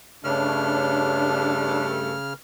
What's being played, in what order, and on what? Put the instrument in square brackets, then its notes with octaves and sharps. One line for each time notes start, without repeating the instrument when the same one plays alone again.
[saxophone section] G2 A3 [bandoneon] C#3 F6 [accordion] D4 [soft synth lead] C#5